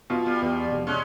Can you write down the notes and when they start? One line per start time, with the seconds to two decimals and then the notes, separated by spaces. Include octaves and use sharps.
0.10 B2 F4
0.26 G3
0.42 E2
0.72 F1
0.87 G#3 C#4